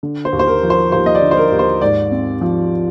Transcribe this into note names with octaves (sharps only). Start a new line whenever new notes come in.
D3
C5
D#2
C5
A#4
F3
C5
D#2 C5
D#5
D5
D3
C5
A#4
D#2
C5
G#2 D5
C4
F3